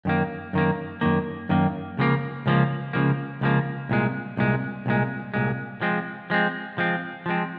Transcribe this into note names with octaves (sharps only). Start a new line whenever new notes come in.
F#2 D#3 A#3
F#2 D#3 A#3
F#2 D#3 A#3
F#2 D#3 A#3
C#2 C#3 F3 A#3
C#2 C#3 F3 A#3
C#2 C#3 F3 A#3
C#2 C#3 F3 A#3
C2 A#2 G#3
C2 A#2 G#3
C2 A#2 G#3
C2 A#2 G#3
F3 G#3 C4
F3 G#3 C4
F3 G#3 C4
F3 G#3 C4